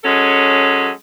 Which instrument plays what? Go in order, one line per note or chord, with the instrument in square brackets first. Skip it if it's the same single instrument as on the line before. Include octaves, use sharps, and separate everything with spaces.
[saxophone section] F#3 G#3 C#4 A4